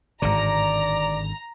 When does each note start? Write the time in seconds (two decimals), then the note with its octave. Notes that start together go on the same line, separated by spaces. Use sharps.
0.22 G#1 G#2 D3 D5 A#5